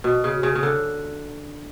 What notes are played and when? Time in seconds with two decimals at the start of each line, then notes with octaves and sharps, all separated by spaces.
0.04 B2
0.24 C#3
0.43 C#3
0.55 C#3
0.63 D3